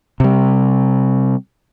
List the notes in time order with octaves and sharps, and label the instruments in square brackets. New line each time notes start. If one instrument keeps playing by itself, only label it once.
[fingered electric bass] C3 G3